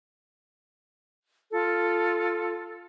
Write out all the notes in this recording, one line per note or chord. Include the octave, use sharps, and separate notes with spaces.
F4 A4